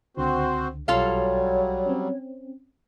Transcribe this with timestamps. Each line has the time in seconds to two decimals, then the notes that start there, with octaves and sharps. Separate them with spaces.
0.17 C#2 D3 C4 F#4 C5
0.88 B1 F#3 G3 F4 A4 C#5 F5
1.86 C4 C#4